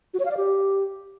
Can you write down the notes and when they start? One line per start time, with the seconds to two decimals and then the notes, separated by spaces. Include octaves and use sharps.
0.14 F#4
0.20 C#5
0.25 F5
0.31 D5
0.37 G4